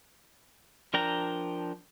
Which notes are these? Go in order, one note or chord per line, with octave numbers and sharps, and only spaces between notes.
F3 D4 A#4 G5 A#5